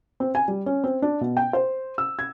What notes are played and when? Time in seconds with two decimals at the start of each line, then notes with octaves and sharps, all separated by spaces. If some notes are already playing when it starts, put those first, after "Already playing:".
0.20 C4
0.35 G#5
0.48 G3
0.66 C#4
0.84 C4
1.02 D4
1.21 B2
1.37 G5
1.53 C5
1.98 E6
2.19 G#6